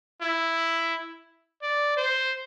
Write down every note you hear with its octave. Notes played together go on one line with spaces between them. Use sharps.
E4
D5
C5